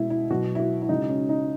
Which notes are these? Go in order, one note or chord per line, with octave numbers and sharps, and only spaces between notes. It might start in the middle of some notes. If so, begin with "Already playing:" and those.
Already playing: B2 G#3 E4
E4
B2 F#3 F#4
E4
F#4
E4
C#3 G#3 D#4
C#4
D#4